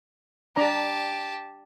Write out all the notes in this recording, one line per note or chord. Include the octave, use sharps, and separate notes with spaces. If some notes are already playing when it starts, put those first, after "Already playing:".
D4 G4 D5 A5 A#5